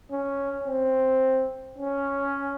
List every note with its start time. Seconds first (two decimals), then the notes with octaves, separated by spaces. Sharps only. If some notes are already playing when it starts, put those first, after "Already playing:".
0.12 C#4
0.67 C4
1.78 C#4